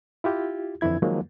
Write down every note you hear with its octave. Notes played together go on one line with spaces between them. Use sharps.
E4 F4 G4
F2 D3 E3 E4 G#6
D#3 F3 F#3 G#3 A#3